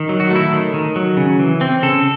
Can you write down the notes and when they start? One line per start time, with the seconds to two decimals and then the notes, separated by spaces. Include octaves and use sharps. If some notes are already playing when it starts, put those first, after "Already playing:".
Already playing: D#3
0.09 F#3
0.20 F#4
0.30 A3
0.36 E4
0.53 D#3
0.74 D#3
0.96 F#3
1.17 C#3
1.39 E3
1.61 C4
1.82 C#3 A4